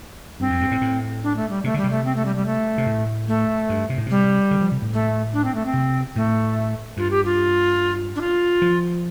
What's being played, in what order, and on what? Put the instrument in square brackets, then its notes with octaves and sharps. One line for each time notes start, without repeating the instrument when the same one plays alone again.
[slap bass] G2 [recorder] C4
[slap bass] F2
G2
A2
A2
[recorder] D4
A3
G3
[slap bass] C3 [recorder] A3
[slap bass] D3 [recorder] G3
[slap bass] C3
[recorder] A3
C4
A3
G3
G3
A3
[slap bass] C3
A2
[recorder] A3
[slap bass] G2
C3
A2
[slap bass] C3 [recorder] G3
[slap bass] D3
F3
C3
A2
[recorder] A3
D4
C4
A3
C4
[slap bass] C3
[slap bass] A2 [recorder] A3
[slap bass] G2 [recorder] F4
[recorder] G4
F4
D4
F4
[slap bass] F3